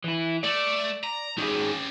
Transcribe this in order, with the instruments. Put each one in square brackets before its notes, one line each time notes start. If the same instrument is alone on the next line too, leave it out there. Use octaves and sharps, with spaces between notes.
[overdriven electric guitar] E3 E4
[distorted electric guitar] A3 [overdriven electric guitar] D5
[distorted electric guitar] A#5
[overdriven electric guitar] D#3 G#4 [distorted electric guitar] C#4 G4